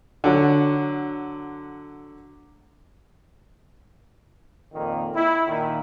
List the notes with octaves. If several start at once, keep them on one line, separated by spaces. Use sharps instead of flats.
D3 F#3
F2 A#2 D#3 A#3
E4
A#2 D#3